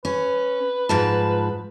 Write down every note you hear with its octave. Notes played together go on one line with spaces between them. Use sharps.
C#4 B4
G#2 F3 A5